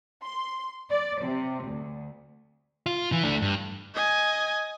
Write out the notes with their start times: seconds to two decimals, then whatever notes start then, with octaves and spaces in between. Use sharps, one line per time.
0.23 C6
0.91 D5
1.23 C3
1.65 D2
2.86 F4
3.12 E3
3.24 A3 D4
3.42 G2
3.95 D#5 G#5